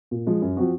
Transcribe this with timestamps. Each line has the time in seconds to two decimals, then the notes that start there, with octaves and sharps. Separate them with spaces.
0.11 A#2
0.27 F3 G#3
0.42 F#2
0.57 F3 C4 F#4